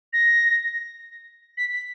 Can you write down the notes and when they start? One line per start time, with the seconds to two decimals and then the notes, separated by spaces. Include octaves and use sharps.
0.13 A#6
1.57 B6
1.73 B6